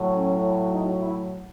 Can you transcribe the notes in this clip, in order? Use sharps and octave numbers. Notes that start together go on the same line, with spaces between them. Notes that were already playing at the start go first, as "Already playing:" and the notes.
Already playing: A2 F#3
C#4
D#4
E4